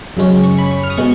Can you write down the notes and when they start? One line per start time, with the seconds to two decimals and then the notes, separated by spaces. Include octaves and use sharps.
0.17 F#2 C#3 G#3 C#4
0.43 C#6
0.58 B5
0.71 C#6
0.83 F6
0.90 D#6
0.97 B2 G#3 C#6